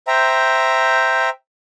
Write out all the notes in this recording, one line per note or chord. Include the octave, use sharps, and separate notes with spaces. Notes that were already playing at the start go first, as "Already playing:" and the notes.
C5 E5 G5 A#5